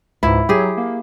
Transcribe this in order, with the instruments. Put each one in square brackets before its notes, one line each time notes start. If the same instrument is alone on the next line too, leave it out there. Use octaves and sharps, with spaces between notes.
[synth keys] C#2 G#2 [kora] E4
[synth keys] F#3 [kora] G4 G#4
[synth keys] A#3